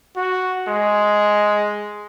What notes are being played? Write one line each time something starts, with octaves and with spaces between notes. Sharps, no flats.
F#4
G#3